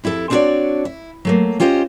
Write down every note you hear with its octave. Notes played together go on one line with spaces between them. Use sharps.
F2 E4 G4 A4
C4 D4 E4 F#4 C#5 D5
E4
F#3 A3 A#3
C#4 F4 G4 C5 C#5 D#5